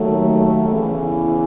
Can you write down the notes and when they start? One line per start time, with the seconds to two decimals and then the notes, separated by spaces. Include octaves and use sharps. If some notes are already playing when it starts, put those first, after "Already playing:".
Already playing: D#2 D#3 F#3 A3
0.69 E2 C#3 E3